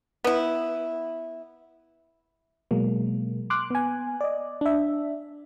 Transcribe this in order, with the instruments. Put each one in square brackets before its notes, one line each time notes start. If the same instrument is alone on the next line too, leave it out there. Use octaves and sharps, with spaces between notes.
[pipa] B3 E4
[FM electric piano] B2 F#3 G#3 A#3
C6 D6 F6 F#6
B3 G#5
D5 D#5
D4 E5